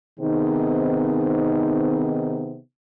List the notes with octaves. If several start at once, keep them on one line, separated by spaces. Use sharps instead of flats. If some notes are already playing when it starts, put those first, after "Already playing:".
C3 D#3 B3 C4 D#4 G#4